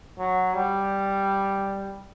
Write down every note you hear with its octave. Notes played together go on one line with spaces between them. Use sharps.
F#3
G3